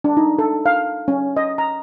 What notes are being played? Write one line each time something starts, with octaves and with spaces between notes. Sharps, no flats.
D4
D#4
A4
F5
C#4
D#5
A#5